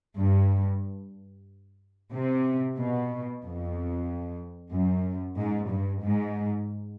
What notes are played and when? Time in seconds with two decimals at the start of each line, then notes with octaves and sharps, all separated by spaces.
0.18 G2
2.13 C3
2.78 B2
3.44 F2
4.74 F#2
5.38 G#2
5.71 G2
6.04 G#2